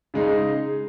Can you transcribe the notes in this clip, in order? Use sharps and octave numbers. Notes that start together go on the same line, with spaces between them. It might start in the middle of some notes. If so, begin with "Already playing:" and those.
C#3 G#3 D#4